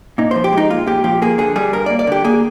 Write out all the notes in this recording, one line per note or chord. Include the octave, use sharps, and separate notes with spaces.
A#2 D#4
F3 C5
G4
G#3 D#4
A#2 F4
A#2 G4
F3 G4
A#3 G#4
D3 G#4
G3 G#4
G2 A#4
D5
A#3
D5
D3 G4
A#3 G#4